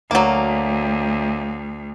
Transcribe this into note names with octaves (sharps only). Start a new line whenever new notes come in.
D2 F#3 A#3